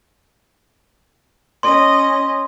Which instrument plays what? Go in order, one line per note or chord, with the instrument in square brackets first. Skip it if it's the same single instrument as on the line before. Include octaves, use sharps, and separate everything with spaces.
[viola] C#4 D#5 [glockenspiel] C6